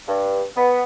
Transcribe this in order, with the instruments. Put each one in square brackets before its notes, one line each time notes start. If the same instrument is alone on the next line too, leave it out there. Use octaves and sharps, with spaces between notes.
[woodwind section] G2
B3